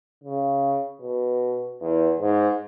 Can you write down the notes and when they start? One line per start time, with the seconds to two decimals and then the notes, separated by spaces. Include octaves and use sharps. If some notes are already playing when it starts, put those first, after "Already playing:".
0.24 C#3
1.02 B2
1.81 E2
2.20 G#2